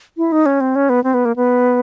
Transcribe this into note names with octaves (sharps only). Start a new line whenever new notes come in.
E4
D#4
C#4
C4
C#4
B3
C4
B3
A#3
B3